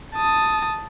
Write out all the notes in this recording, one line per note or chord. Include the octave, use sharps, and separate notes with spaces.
A5 D#6